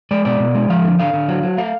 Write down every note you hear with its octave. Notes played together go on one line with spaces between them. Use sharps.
G#3 D5
B2 D5
B2
G#3
F3 F5
D3
D3 F5
D3
F#3
F#3
A3 F5